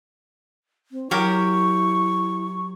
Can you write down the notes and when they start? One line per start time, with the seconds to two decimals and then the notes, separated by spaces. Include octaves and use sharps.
0.92 C4
1.11 F#3 E4 G4 A#4 C#6